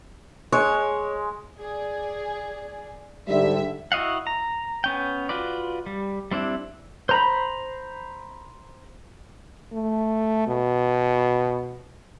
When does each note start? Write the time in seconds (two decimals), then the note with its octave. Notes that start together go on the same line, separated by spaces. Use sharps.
0.52 G#3 C#5
1.59 G#4 D5
3.29 G#2 D3 G3 E5
3.92 E4 F#4 D#5 F5 F#5
4.27 A#5
4.84 B3 C#4 G5
5.29 F4 F#4 B4 D5
5.86 G3
6.31 G3 C4 D4 E4
7.09 C5 A#5 B5
9.72 A3
10.48 B2